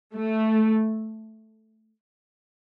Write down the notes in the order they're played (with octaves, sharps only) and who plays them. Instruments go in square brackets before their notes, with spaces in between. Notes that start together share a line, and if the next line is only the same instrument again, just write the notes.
[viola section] A3